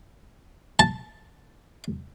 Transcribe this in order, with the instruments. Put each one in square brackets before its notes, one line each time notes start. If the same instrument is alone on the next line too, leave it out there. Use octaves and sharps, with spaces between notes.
[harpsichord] A5